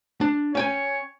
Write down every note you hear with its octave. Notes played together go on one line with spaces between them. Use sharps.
D4
C#4 C#5 G5 G#5